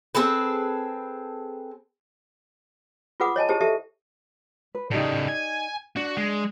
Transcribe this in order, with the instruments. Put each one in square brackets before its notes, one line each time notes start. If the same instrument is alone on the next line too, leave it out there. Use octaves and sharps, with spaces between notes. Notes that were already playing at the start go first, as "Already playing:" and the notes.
[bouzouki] C4 G#4 A4 B4
[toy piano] F4 G#4 B4 F#5 D6 D#6
C#5 D#5 G#5 A5
E4 G4 G#4 C5 A5
G4 A4 E5 A5
[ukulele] B4
[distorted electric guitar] A2 C#3 [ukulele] D#4 G4 D5
[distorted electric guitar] G#5
[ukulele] D4 [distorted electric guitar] F#4
[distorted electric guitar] G#3